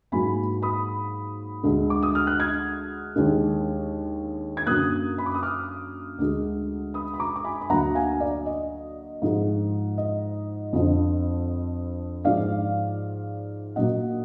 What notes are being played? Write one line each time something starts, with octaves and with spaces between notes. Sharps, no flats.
G#2 F#3 A#3 G#5 B5
B5 D#6
D2 D3 G#3
D6
D#6
F6
F#6
F6 G#6
D#2 D3 G#3
G#6
F#2 D3 F#3 A#3 D#6 F#6
B5
D6
D#6
D6 F6
D2 D3 G#3
B5 D#6
B5
A#5 D6
D6
G#5 B5
B5
D2 D3 F#3 A#3 F#5 A#5
F5 G#5
D5
D#5
G#2 F3 G#3
D#5
F2 D3 F3
G#2 F3 G#3 D5 F5
A#2 F#3 A#3 D#5 F#5